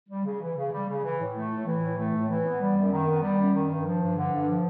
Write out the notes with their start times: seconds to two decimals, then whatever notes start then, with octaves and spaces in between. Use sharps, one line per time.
0.09 G3
0.25 C#3
0.41 E3
0.56 C#3
0.72 G3
0.88 C#3
1.03 E3
1.19 A2
1.34 A3
1.50 A2
1.66 E3
1.81 A2
1.97 A3
2.13 A2
2.28 E3
2.44 B3
2.60 G3
2.75 F#2
2.91 D#3
3.07 B3
3.22 G3
3.38 F#2
3.54 D#3
3.69 G2
3.85 F3
4.01 G2
4.15 D3
4.31 G2
4.48 F3